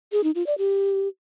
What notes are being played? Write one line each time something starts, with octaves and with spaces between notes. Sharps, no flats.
G#4
D#4
F4
D5
G4